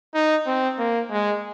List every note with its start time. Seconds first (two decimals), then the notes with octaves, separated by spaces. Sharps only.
0.14 D#4
0.47 C4
0.78 A#3
1.11 G#3